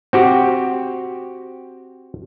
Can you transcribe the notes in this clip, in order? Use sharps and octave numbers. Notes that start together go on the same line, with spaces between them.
C4 F#4 G4